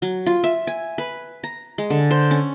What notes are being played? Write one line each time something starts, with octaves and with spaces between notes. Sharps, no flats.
F#3
F4
E5
G#5
B4
A#5
G#3
D3
C5
C#4